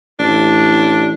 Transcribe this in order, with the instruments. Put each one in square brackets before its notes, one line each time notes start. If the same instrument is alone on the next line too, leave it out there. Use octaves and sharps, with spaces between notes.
[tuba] A1 [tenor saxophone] D4